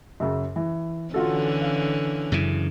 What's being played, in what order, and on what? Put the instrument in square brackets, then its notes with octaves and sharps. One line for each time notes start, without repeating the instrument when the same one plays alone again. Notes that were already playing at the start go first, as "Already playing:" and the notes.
[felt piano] F#2 C#3
E3
[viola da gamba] D3 E3 C#4 [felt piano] F4 F#4 A4
[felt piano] F5
[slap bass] F#2 C#3 E3